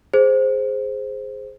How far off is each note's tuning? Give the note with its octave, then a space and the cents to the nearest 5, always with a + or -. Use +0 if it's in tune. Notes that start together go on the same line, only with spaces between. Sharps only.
G#4 +0 C5 +0